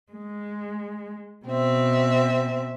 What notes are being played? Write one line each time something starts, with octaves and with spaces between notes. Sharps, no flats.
G#3
B2 C4 E5